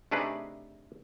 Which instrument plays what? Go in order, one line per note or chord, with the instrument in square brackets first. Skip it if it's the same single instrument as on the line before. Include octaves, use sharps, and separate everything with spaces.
[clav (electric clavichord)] C3 A3 D4 D#4 G#4 B4